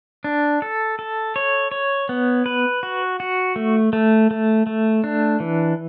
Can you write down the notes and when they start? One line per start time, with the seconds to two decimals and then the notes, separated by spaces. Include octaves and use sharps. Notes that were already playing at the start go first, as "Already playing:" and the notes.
0.24 D4
0.62 A4
0.99 A4
1.36 C#5
1.71 C#5
2.09 B3
2.46 B4
2.83 F#4
3.20 F#4
3.56 A3
3.93 A3
4.31 A3
4.67 A3
5.04 D4
5.40 E3